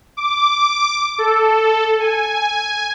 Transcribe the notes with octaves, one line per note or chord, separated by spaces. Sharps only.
D6
A4
G#5